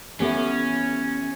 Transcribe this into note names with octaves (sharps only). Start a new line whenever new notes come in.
E3 B3 C#4 G4 A4 B4 E5